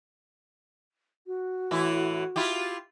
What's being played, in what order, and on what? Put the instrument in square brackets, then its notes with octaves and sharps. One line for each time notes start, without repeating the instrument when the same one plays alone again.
[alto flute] F#4
[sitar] A2 E3 E4
E4 F4 G4